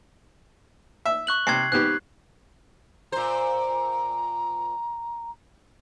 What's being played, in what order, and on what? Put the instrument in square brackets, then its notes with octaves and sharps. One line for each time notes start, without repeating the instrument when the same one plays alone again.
[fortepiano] E5
[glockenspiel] C#6 F#6 F#7
[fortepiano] C3 [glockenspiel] G#6 C7
[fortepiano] G#2 B3 G4 [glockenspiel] F#6
[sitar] A#2 C5 [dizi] A#5